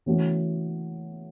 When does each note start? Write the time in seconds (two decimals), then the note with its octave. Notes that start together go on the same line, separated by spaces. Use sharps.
0.06 E3 A3 C#4 F#4